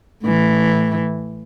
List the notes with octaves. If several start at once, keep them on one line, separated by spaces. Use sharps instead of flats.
A2 E3